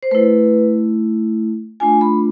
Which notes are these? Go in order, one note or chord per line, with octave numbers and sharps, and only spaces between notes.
C5
A3 E4 B4
A3 D4 F4 G#5
B5